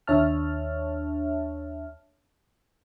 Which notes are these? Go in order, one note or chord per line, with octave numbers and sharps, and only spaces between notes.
D#2 D4 C#5 E5 A5 F6